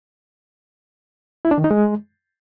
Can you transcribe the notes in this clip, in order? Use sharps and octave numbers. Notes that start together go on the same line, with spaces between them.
E4
D4
D#3
D#4
G#3